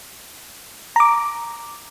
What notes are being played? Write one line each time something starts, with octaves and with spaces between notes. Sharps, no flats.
A#5 D6